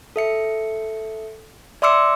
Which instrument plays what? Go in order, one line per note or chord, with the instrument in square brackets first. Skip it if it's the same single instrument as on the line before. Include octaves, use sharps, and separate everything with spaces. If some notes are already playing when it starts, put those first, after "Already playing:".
[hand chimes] A4 E5 C#7
D5 E5 C6 D6 E6 C#7